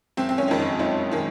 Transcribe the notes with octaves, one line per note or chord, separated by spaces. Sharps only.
F#1 C4
C4
C#4
F2 D#3 G#3
D#4
F#1 D#4
D#3 G#3